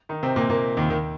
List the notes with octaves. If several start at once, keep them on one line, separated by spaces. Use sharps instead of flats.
D#3 D#4
C3 C4
A#2 A#3
A#2 A#3
D#2 D#3
D#2 D#3